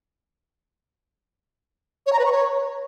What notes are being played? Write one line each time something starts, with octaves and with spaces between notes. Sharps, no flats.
C#5
A#5
B4
C#6
C#5